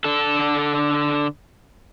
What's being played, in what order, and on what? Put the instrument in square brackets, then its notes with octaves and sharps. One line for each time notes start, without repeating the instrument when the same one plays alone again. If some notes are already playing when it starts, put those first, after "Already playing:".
[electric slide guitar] D3 A4